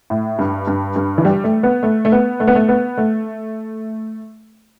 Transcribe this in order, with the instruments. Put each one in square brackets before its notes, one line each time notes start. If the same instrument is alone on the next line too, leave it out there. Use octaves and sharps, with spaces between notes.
[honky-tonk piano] A2
G2
G2
G2
E3
G3
A3
B3
A3
A3
B3
A3
B3
A3
B3
A3